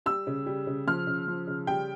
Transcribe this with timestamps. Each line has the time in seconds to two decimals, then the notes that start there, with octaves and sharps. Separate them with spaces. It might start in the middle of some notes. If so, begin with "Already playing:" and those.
0.06 G3 E6
0.27 C#3
0.46 G3
0.67 C#3
0.87 F3 F6
1.07 C#3
1.27 F3
1.47 C#3
1.67 G3 G5